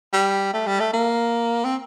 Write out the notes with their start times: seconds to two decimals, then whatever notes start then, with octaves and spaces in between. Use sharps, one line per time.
0.13 G3
0.54 A3
0.67 G3
0.80 A3
0.93 A#3
1.65 C4